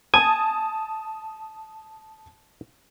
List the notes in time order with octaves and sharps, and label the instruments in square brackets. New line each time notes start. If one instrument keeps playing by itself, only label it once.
[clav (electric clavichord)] G#5 [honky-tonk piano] A5 D#6